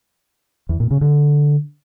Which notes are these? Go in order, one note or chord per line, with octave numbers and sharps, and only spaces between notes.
E2
A#2
C#3
D3